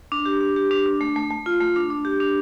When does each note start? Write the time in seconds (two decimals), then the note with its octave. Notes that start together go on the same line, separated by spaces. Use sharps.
0.12 D4
0.26 G4
0.41 D4
0.56 G4
0.71 D4
0.86 D4
1.01 A3
1.16 A3
1.30 A3
1.46 F4
1.61 A3
1.76 D4
1.90 D4
2.05 G4
2.20 D4